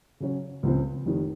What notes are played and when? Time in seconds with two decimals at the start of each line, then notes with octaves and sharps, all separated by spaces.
0.20 C#3 F#3 C#4
0.63 C#2 C#3 F3 C4
1.05 F1 F2 D#3